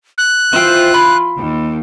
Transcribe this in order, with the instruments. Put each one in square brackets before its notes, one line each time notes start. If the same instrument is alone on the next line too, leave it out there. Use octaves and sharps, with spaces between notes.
[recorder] F#6
[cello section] E3 F4 [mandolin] C5 E5 G5
[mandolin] B5 C6
[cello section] D#2